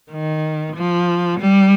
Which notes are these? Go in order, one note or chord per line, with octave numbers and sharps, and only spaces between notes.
D#3
F3
G3